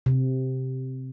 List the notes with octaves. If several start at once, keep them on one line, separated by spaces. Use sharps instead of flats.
C3